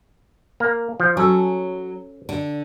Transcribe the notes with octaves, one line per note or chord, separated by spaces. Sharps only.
A#3
F3
F#3 C#4 A4
D3